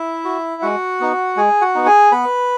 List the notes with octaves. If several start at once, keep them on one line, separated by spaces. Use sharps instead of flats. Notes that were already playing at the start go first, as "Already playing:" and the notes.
Already playing: E4 E5
F#4
G#3 F#4 F#5
B3 D#4
G#3 G#4 G#5
F#4 F#5
B3 D#4
G#4 G#5
B3 B4 B5